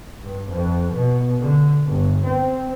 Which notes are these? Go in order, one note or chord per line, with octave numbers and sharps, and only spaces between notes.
G2
F2
B2
D3
G1
C4